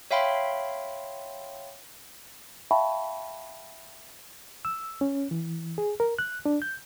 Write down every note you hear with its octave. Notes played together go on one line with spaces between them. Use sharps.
C#5 E5 F5 G5 B5 C6
E5 F5 G5 A5 B5 C#6
E6
C#4
E3
G#4
A#4
F#6
D4
G6